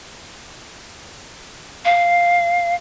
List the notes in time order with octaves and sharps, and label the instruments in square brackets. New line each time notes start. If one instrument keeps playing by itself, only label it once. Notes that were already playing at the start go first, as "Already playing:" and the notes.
[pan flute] F5